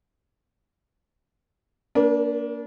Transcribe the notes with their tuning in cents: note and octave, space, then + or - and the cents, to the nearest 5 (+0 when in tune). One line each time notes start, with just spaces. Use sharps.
A#3 +0 D4 -25 A#4 +45